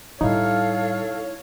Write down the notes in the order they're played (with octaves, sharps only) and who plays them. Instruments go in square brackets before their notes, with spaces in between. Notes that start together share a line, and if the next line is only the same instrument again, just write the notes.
[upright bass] A2 G3 [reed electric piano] D#4 E4 [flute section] A4 F5 [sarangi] C#5